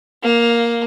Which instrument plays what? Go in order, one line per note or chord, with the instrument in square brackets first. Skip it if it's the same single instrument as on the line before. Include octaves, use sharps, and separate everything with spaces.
[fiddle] A#3